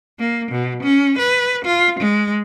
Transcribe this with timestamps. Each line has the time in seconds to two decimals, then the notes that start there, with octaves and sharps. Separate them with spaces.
0.19 A#3
0.51 B2
0.83 C#4
1.18 B4
1.65 F4
2.00 G#3